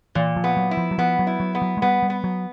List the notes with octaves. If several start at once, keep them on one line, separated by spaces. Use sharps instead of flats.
A#2 E3
F3
B3
F#3
E4
F3
F#3
F3 B3
F#3
E4
F#3
B3
F#3
G#3
G3 B3
G3
B3
F#3